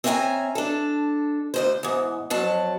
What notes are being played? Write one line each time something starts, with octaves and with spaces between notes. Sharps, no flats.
C4 C#4 E5 F5 G#5 A#5
D4 A4
D2 A#2 C5
E2 G#2
F2 F#3 A5